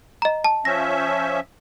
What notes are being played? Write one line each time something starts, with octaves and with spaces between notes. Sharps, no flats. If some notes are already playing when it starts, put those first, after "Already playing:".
D#5 A#5
A5
F3 C#4 E5 A#6